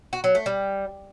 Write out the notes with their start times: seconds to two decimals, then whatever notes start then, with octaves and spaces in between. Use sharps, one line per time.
0.13 F#4
0.24 F#3
0.35 A3
0.46 G3